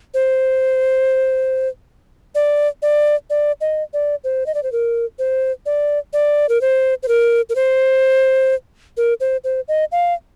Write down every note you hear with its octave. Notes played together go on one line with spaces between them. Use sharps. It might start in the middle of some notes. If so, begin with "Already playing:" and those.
C5
D5
D5
D5
D#5
D5
C5
D#5
D5
C5
A#4
C5
D5
D5
A#4
C5
C5
A#4
A#4
C5
A#4
C5
C5
D#5
F5